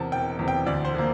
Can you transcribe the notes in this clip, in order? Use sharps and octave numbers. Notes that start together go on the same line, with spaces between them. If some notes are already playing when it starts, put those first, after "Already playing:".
Already playing: E2 C3 A#4 A5
E1 G5
E2 C3
G5
D2 D5
C5
D3 F3 A#3